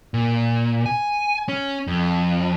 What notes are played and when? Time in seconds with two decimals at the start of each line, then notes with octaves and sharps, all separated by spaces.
0.14 A#2
0.86 G#5
1.49 C#4
1.87 F2